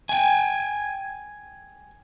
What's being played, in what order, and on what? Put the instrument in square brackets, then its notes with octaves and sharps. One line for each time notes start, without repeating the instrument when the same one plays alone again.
[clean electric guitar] G5 G#5